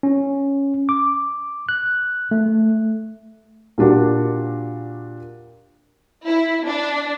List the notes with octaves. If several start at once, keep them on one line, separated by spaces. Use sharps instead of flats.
C#4
D6
F#6
A3
A#2 G3 D4 F#4 A#4
E4
D4